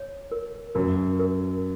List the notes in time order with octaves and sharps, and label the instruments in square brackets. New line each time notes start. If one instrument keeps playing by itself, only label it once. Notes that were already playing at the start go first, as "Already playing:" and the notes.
Already playing: [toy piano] C#5
A#4
[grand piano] F#2 [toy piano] A#4
[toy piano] A#4